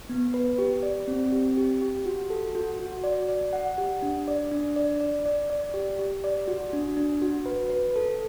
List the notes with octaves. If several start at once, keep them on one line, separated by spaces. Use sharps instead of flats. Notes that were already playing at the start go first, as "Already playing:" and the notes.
B3
B4
G4
D5
C4
G4
G4
G4
F#4
A4
F#4
F#4
D5
D5
F#5
G4
D4
D5
D4
D5
D5
D5
D5
G4
G4
D5
F#4
D4
D4
F#4
B4
B4
A4